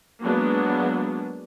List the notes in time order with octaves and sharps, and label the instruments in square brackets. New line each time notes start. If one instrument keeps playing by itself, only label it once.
[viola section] F#3 G#3 A#3 B3 D4